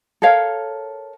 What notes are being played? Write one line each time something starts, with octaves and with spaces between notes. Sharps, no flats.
A4 A#4 C#5 F5